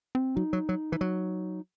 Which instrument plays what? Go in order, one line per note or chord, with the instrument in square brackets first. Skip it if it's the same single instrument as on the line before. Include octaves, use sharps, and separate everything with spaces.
[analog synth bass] C4
[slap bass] F#3 [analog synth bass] D#4
[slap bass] F#3
F#3
E3
F#3